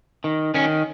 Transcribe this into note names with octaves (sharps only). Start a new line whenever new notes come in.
D#3
D#3 C#4